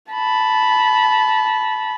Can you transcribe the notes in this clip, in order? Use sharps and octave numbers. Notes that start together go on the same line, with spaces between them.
A5 B5